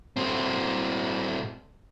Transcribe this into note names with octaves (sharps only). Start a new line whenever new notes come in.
A2 C4